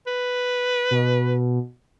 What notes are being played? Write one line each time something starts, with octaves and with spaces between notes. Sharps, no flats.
B4
B2